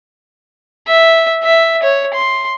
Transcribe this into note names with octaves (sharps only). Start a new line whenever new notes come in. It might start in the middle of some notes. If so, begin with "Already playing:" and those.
E5
E5
C#5
C6